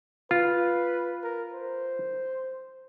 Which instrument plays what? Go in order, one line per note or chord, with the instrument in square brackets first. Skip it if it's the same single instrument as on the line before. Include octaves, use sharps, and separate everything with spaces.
[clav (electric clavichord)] F4 [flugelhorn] B4
[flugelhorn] A#4
C5